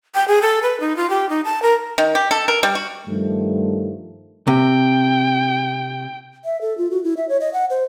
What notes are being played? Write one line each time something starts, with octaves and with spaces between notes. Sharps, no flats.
G5
G#4
A4
B4
D#4
F4
G4
D#4
A5
A#4
D#3
G4
A4
A#4
G3
F#4
G2 D#3 F3 G3 A3
C3 G5
E5
A4
F4
F#4
E4
E5
C#5
D#5
F#5
C5